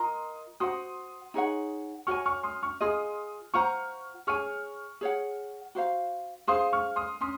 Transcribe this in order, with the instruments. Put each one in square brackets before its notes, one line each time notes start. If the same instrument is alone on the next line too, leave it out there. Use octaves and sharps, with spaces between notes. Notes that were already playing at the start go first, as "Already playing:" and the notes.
Already playing: [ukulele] F4 A#4 D#5 A#5 [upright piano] C6 D#6
[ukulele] F#4 C5 F#5 [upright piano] C6 D#6
[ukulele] D#4 G#4 C#5 F#5
[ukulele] F#4 C#5 G#5 [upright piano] C#6 F6
[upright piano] C#6 F6
C6 D#6
C#6 F6
[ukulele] F4 G#4 D#5 [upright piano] C6 D#6
[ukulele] F4 C5 F#5 A#5 [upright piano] C#6 F6
[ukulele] G#4 C#5 G#5 [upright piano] C#6 F6
[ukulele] G#4 C#5 F#5
F#4 C5 F5
[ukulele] G#4 C5 F5 [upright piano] C6 D#6
[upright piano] C#6 F6
C6 D#6
[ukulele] C#4 [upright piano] C6 D#6